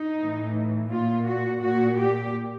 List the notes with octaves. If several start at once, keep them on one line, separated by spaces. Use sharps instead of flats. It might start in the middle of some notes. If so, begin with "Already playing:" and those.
Already playing: D#4
A2 E3
A#2 F4
F#4
A#2 F#4
G4